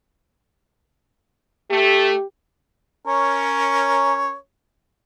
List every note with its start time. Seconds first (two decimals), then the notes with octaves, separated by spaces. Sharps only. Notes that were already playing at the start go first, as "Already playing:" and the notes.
1.71 A3 G4
3.06 C#4 A#4 C#5